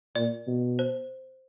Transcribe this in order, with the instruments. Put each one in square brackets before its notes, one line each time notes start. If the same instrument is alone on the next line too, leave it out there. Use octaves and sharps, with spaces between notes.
[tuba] A#2 [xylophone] D5
[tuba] B2
[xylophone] C5